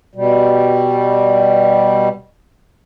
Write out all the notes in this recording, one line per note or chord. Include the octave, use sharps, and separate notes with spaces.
B2 G3